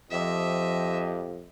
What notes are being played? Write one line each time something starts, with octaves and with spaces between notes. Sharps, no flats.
F2 F3 G4 D#5 E5